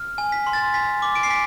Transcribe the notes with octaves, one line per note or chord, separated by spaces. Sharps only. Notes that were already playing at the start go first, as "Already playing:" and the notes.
Already playing: F6
G#5
B6
C6
A6
G#5 B6
D6
D7
C7
G#5 B6